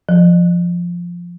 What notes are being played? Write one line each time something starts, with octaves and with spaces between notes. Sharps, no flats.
F3